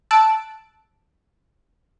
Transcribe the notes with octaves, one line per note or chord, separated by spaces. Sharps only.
A5 E6 F#6 D7